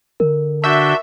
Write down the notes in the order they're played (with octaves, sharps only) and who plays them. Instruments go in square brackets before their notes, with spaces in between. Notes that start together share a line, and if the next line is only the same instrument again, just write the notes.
[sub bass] D3 [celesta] A#4
[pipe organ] D4 F#4 G6 [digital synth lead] E5